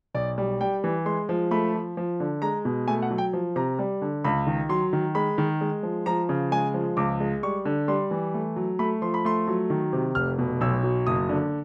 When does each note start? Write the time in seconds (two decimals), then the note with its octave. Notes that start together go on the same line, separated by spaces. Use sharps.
0.15 B1 D5
0.38 G3
0.61 G3 G5
0.84 E3
1.06 G#3 C6
1.29 F3
1.51 A3 B5
1.74 F3
1.97 F3
2.20 D3
2.42 G#3 A#5
2.65 B2
2.88 A3 G#5
3.02 F#5
3.11 F#3
3.18 G5
3.33 F3
3.56 C3 A#5
3.79 G3
4.02 D3
4.24 C#2 B5
4.47 D#3
4.69 F#3 C6
4.93 D#3
5.15 G#3 B5
5.38 D#3
5.61 G#3
5.83 F3
6.06 F3 A#5
6.29 C#3
6.52 G#3 G#5
6.74 F3
6.97 C#2 D6
7.20 G#3
7.43 G3 C#6
7.65 D3
7.88 G3 C6
8.11 E3
8.34 A3
8.56 F#3
8.79 A3 B5
9.02 F3 C6
9.14 B5
9.25 A3 C6
9.48 F#3
9.70 D#3
9.93 C3
10.15 F1 F6
10.38 B2
10.61 B1 E6
10.83 F#3
11.07 F#1 D#6
11.29 D3